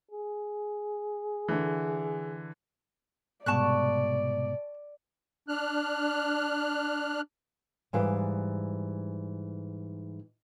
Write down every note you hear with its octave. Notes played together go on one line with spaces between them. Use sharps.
G#4
D3 E3
C2 G#2 B2 D5 A5 C#6 F#6
D4 F6 F#6
G#2 E3 G3 F5